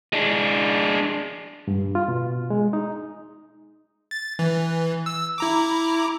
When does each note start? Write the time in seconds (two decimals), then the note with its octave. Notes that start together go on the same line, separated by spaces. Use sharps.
0.13 G#3 D4
1.68 G2
1.95 F4
2.08 B2
2.50 G#3
2.73 D#4
4.11 A6
4.39 E3
5.06 E6
5.38 E4 A#5 D6